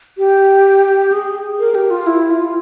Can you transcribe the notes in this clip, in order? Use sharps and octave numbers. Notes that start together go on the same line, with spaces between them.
G4
G#4
A#4
G4
F4
E4
F4